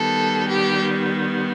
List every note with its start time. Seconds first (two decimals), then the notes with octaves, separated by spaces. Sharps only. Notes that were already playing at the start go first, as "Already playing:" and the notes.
Already playing: D#3 G3 B3 A4
0.49 G4